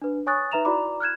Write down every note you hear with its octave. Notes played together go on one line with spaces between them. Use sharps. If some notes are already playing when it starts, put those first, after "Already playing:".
D4 B4
C#5 G#5 C#6 D#6 F#6 A6
D#4 B4 E5 A#5 E7 F7
E4 F#4 D5 A#5 B5 D6
F6 F#6 G#6 E7